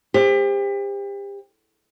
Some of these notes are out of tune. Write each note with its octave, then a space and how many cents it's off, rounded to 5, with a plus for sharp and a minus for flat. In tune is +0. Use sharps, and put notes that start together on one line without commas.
G4 +35 C5 +0